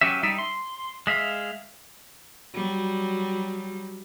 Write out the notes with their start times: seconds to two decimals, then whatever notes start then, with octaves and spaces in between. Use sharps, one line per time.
0.01 F#3 C#4 G4 E5
0.23 G3 D#4 E5
0.39 C6
1.07 G#3 E5 F5
2.54 F#3 G3